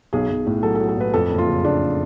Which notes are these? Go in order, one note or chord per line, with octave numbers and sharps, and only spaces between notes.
B1 G#4
B1
A2
F#3 A4
A4
F#3
A4
A2 B4
F2 A4
F#1
F4
C#3
C#3 D4